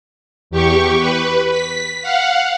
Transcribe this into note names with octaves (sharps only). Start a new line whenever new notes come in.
E2 G4 C#6
B4
B6
F5 F#5